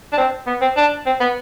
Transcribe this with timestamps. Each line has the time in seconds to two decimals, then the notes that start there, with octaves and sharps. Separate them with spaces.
0.13 D4
0.17 C4
0.47 B3
0.62 C4
0.77 D4
1.06 C4
1.20 B3